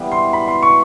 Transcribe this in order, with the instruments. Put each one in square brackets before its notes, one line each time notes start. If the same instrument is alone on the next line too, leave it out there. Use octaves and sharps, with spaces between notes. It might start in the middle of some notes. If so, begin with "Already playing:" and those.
Already playing: [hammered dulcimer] E3 G3 B3
[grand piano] C6
B5
C6
C#6